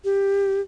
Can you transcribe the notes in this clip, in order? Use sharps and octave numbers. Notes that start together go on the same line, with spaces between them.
G4